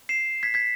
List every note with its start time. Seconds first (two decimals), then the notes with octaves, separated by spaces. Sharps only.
0.09 C7 E7
0.43 G#6 B6
0.54 G#6 B6